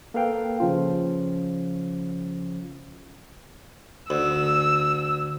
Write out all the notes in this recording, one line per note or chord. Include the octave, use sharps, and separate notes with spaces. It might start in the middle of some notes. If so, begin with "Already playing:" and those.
A#3 A4 B4 F5 G5
C#3 F3 C#4 F4
D2 E6